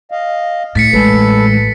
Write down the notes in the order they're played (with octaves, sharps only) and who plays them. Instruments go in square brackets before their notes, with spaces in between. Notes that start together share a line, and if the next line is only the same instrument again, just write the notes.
[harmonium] D#5 F5
[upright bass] A2 [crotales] A6 B6 C#7
[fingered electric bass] A1 G#3 [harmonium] A4 B4